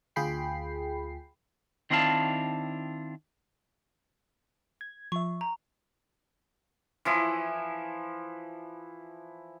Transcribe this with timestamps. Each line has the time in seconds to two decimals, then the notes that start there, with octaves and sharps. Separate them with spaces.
0.16 D2 F4 G#4 G5 B5 C7
1.90 D#3 C4 D4 E4 F5 A5
4.81 G#6
5.12 F3 E5 C#6
5.41 A#5
7.05 E3 F3 E4